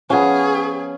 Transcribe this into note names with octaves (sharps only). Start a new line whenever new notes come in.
F3 B3 C#4 G#4